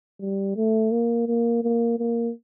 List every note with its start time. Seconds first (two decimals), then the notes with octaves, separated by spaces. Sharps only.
0.20 G3
0.56 A3
0.91 A#3
1.27 A#3
1.63 A#3
1.99 A#3